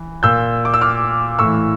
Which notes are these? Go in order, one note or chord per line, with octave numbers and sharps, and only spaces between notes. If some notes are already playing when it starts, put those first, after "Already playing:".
Already playing: E3
A#2 E6 G6
D6
E6
D6 F6
A2 E3 C#6 E6